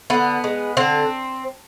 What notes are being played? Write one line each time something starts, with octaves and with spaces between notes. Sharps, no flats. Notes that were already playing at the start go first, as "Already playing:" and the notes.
D3 B3
G#3
D3 C4